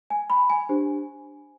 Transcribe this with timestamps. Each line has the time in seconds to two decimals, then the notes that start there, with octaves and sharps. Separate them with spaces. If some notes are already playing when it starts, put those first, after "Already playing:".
0.10 G#5
0.30 B5
0.50 G#5
0.69 D4 G4 C5